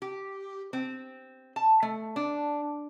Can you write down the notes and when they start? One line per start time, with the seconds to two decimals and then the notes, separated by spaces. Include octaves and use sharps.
0.02 G4
0.73 C4
1.56 A5
1.83 A3
2.16 D4